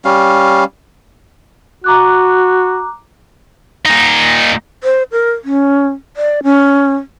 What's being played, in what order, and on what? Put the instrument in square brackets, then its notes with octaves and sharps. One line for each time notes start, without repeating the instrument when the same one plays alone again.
[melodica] G3 C#4 F5
[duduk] F#4 [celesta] A#5 D6 F#6
[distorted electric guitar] A#2 D#4
[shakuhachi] C5
A#4
C#4
D5
C#4